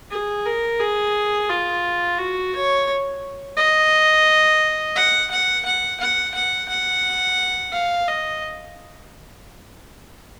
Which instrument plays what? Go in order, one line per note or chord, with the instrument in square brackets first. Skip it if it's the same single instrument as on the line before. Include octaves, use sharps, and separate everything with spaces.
[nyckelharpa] G#4
A#4
G#4
F4
F#4
C#5
D#5
F#5
F#5
F#5
F#5
F#5
F#5
F5
D#5